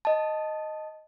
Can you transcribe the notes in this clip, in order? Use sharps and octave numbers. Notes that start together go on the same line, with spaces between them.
D#5 A5